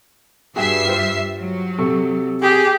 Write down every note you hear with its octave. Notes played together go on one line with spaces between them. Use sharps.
G2 F#4 G#4 E5 G5 C7
F4 G4 C5
F#3
C3 A4 C#6
G4 G#4